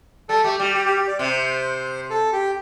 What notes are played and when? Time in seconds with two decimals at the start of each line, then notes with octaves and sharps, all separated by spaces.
0.29 G3 A4
0.44 A3 G4
0.59 G3 G4
0.74 G4
0.86 G4
0.97 G4
1.08 D5
1.19 C3 C5
2.10 A4
2.33 G4